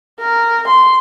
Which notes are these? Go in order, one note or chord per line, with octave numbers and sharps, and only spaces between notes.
A#4
C6